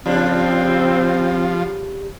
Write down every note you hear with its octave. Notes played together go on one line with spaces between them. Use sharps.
C#3 F3 G3 C4 D4